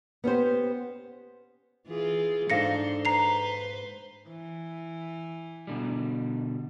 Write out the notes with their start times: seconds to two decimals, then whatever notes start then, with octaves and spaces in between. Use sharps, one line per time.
0.24 B3 C#4 G4 C5
1.87 E3 F4 G#4
2.50 G#2 D4 D#4 A4 C5 F5 A#6 C#7
3.05 B4 C5 A#5 C7 F7
4.28 E3
5.67 B2 D3 G3